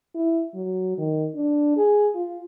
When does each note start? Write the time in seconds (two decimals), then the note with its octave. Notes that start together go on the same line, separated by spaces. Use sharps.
0.15 E4
0.55 F#3
0.98 D#3
1.36 D4
1.77 G#4
2.15 F4